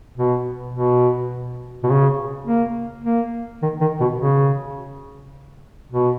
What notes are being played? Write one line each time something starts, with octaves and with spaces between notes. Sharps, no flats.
B2
B2
B2
C#3
A#3
A#3
D#3
D#3
B2
C#3
B2